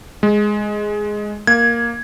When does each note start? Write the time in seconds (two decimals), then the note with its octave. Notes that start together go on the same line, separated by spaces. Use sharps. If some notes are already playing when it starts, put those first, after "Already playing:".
0.23 G#3
1.47 A#3 G#6